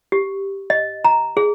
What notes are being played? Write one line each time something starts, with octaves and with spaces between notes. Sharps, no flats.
G4
D#5
A#5
G#4